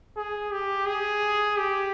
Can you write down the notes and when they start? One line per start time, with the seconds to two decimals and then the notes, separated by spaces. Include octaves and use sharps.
0.16 G#4
0.52 G4
0.86 G#4
1.58 G4